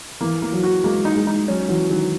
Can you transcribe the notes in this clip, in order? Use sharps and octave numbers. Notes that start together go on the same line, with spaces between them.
E3 A#3
A#3
F#3
F#4
G#3 A#3
D#4
G#3
D#4
F#3 C#4
E3 F#3
D#3 F#3